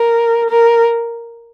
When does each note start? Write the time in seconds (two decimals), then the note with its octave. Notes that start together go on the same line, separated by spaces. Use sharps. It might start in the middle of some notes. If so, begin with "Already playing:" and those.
Already playing: A#4
0.50 A#4